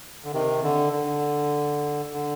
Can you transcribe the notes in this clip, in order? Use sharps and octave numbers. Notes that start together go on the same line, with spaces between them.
D3
C3 D#3
D3
D3
D3